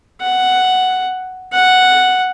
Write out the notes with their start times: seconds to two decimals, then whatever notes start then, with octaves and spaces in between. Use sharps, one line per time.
0.21 F#5
1.53 F#5